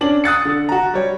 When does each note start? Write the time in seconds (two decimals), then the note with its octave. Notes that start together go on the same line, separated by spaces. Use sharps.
0.01 C#4 D4 F#7
0.24 D#6 F#6 A6 C#7
0.45 D3
0.69 F#4 A#5
0.94 G3 C#5